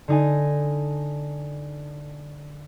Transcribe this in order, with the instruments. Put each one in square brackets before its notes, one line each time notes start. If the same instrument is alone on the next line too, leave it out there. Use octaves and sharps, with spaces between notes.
[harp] D3 D#4 G#5